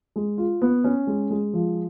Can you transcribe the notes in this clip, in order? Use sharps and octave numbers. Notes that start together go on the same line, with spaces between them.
G#3
F4
B3
C#4
G#3
G#3
F3